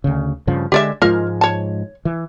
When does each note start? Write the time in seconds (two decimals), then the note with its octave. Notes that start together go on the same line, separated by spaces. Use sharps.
0.04 D2 C#3
0.47 G2 C#3 F3
0.72 D3 G#3 G4 D5 E5
1.02 G#2 F3 G#3 F4 A#4
1.41 C#5 A5
2.05 E3